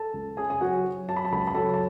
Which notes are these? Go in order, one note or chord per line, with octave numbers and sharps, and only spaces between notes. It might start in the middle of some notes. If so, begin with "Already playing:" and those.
Already playing: A4 A5
C#2
C#3 G#4 G#5
G#5
F#3 F#4 F#5
F#3
F#3 A5
B5
A5
C#2 B5
A5
B5
F#3 A4 A5
A5